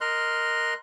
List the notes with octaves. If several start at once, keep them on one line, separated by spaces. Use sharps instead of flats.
A#4 D#5 C6 F6 F#6